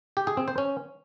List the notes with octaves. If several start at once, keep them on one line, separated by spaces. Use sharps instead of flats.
G4
G#4
C4
C5
C#4